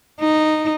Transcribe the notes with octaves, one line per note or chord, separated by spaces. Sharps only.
D#4